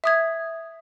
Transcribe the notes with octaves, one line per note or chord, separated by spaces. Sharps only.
E5 D#6 G#6